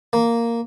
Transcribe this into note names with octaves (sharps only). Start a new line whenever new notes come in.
A#3